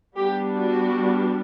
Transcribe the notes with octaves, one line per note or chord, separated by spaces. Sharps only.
G3 B3 D4 G4
F#4